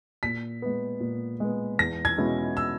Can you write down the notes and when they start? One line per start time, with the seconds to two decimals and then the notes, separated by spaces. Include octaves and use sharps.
0.23 A#2 B6
0.62 G#3 B3
1.00 A#2
1.40 G#3 B3
1.79 E2 A#6
2.05 G#6
2.18 B2 G#3 C#4 E4
2.57 E6